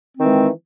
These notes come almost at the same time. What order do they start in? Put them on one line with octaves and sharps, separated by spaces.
C4 D#3 E3 G#3